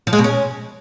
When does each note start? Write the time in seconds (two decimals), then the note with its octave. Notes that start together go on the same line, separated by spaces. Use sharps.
0.07 F3
0.13 G#3
0.18 B2
0.24 C#4